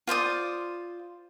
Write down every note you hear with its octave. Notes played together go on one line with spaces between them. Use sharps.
F4 C5 D5 D#6